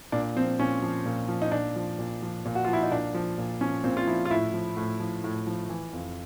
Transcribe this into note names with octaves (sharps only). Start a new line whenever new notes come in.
A#2 D4
F3 C4
A#2 C#4
F3
A#2
F3
D#4
A#2 D4
F3
A#2
F3
A#2
F#4
F3 F4
E4
D#4
A#2 D4
F3
A#2
F3 C#4
A#2 C4
F4
F3 E4
F4
A2 E4
F3
A2
F3
A2
F3
E3
F2